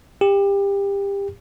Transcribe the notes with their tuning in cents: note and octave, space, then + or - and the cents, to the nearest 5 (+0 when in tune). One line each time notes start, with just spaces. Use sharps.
G4 +25